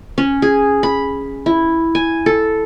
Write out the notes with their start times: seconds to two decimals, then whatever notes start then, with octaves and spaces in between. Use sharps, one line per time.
0.18 C#4
0.42 G#4
0.83 B5
1.46 E4
1.95 G#5
2.26 A4